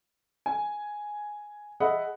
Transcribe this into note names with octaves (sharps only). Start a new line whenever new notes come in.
G#5
G#4 D#5 E5 F#5 B5